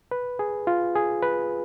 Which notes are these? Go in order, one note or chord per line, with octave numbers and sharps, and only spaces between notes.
B4
G#4
F4
G#4
B4